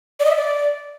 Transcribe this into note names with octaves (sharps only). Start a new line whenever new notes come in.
D5
D#5
E5
D5